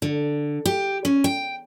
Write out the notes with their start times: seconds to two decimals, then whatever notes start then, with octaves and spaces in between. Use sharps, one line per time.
0.02 D3
0.66 G4
1.05 C#4
1.24 G5